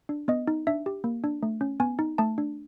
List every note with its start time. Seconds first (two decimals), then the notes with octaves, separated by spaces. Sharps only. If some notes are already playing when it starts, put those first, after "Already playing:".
0.09 D4
0.28 B3 D#5
0.48 D#4
0.67 D4 E5
0.86 G4
1.04 A#3
1.24 D4
1.43 A3
1.61 C#4
1.80 B3 G#5
1.99 D#4
2.18 A3 A5
2.38 D4